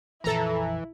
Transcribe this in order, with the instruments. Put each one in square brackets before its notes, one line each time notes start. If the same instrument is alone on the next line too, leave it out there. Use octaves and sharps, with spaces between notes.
[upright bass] A#1 F2 [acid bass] E3 [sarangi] E4 [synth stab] A4 A#5